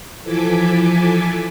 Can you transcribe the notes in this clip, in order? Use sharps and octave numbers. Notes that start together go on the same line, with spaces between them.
E3 F3 A4 G#5 D6 B6